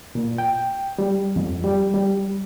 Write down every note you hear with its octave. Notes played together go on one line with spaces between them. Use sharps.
A#2
G5
G3
F2
G3
G3